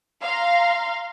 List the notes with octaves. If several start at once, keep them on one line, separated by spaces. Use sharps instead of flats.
F5 A#5 C6